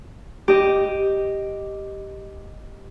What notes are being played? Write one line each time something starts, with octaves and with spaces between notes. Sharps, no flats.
G4 D#5